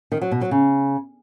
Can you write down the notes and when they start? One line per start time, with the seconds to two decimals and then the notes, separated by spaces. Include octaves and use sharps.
0.12 D#3
0.22 F#3
0.31 B2
0.41 F#3
0.51 C#3